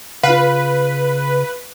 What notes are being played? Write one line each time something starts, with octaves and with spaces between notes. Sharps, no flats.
C#3 F4 B4 F5